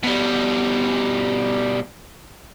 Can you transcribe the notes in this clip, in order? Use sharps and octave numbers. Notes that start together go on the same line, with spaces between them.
B2 G3